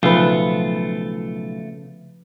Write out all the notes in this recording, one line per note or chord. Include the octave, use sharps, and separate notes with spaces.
B1 C#3 F3 A3 F4 B4